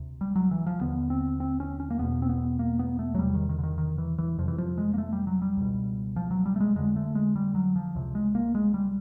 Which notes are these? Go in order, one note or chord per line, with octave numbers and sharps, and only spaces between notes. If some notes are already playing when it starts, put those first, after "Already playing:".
Already playing: D2 C3
G3
F#3
E3
F3
D#2 D3 B3
C4
C4
C#4
C#4
A#3
E2 B2 B3
C4
B3
A#3
B3
A3
F#3
E2 C3 G3
D#3
D#3
D3
D#3
D#3
E3
E3
F2 C3 F3
E3
F3
G#3
A#3
A3
G3
F#3
G3
C#2 B2
F3
F#3
G3
A3
G#3
F2 D3 G#3
A3
G#3
G3
F#3
F3
C#2 C3
G#3
A#3
G#3
G3